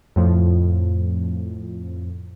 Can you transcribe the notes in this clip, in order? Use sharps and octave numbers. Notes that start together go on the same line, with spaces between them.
F2 A2 F3